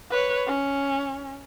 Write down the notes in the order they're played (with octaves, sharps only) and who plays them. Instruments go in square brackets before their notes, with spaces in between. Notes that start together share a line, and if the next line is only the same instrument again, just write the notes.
[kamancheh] B4 C#5
C#4